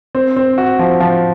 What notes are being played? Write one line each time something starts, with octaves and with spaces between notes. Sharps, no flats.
C4
C4
F#4
F3
F3